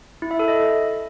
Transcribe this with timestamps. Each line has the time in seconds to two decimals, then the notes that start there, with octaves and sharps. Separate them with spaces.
0.22 E4
0.31 E5
0.39 A4
0.48 D#5